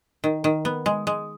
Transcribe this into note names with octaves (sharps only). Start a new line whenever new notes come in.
D#3
D#3
B3
G#3
G#3